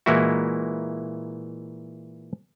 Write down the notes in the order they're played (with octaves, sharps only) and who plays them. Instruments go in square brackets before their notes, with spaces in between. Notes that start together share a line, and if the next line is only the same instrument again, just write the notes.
[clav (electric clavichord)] A#2 E3 G#3 A#3 E4 F#4